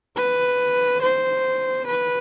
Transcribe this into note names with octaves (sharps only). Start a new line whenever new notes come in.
B4
C5
B4